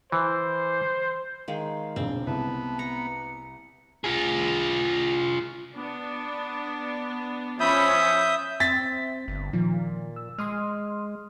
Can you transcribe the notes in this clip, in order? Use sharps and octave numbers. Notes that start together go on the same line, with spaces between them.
E3 C5
D#3 G#3 F5
E1 A#1 C4 D5
C2 B3 A5
A#5 C#7
F4 G#4
B3 D4
F3 C#4 E5 B5 D#6 G6
C4 E5 A6 B6
G1
A#2 D#3 F3
E6
G#3 C6 D#6 F6